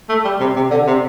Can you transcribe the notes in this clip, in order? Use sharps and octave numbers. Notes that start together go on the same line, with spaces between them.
A3
G3
C3
C3
D3
C3